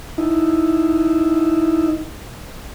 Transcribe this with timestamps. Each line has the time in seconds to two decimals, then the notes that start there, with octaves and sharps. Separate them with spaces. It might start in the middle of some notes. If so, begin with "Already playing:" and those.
0.18 D#4 E4